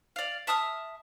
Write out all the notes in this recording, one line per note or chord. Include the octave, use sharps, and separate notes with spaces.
D5 F5
E5 A5 D#6 F6